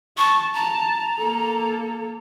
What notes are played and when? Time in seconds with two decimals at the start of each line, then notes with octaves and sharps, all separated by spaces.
0.18 A5 C#6
0.54 A5 A#5
1.19 A#3 A4